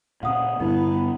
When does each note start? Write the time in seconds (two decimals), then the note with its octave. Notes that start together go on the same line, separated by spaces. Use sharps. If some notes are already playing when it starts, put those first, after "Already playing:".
0.23 A#2 C#3 F5 F#5 D#6
0.60 G2 D3 B3 E4